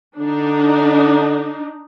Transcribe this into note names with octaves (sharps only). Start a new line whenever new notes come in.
D3 D4 D#4